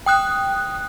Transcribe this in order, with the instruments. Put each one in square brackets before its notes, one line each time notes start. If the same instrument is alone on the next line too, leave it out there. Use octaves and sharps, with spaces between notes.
[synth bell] G5 D#6 F#6